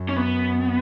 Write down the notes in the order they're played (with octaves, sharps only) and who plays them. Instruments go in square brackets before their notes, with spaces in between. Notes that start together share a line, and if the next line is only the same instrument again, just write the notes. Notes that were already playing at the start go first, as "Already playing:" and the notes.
Already playing: [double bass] F#2
[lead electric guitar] C#4
B3